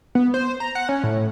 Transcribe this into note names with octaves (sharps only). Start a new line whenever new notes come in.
B3
C5
A#5
F#5
C#4
A2